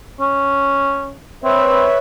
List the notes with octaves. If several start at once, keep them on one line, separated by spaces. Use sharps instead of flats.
C#4
C4 B4 C#5 E5